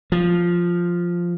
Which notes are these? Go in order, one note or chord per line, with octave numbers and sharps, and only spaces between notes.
F3